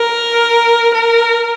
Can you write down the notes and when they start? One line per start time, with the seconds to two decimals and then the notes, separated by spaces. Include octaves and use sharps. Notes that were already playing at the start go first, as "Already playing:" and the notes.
Already playing: A#4
0.94 A#4